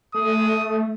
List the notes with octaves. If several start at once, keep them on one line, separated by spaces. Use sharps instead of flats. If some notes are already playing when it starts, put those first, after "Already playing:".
A3 D#6